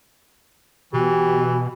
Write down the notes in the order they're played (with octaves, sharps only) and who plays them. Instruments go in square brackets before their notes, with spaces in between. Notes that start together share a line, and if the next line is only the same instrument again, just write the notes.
[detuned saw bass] B2 [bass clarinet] E3 [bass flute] F#4 [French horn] G4